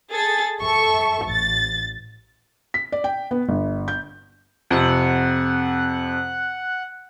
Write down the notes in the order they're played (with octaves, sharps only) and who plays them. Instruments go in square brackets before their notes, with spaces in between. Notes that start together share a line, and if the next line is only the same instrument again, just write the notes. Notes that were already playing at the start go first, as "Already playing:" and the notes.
[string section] G#4 A4 A6
A4 E5 C#6
A1 A6
[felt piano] B6
D5
G5
B3
G1
G6
[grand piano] F2 C3 [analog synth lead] F#5